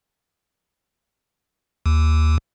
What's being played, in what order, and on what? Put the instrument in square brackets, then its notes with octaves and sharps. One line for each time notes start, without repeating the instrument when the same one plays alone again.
[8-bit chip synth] D#2